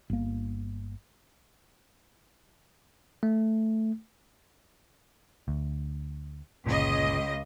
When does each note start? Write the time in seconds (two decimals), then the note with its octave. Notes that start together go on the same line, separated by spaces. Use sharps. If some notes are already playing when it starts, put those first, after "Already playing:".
0.10 G1 A#3
3.23 A3
5.48 D2
6.67 G1 C#2 A#2 D#5